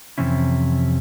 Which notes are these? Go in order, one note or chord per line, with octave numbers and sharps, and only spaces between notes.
F2 C3 E3 C#4 E4